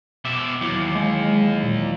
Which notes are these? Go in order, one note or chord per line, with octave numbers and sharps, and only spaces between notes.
B2 E5 D6
D#2 E3 F#3
G#3
A#2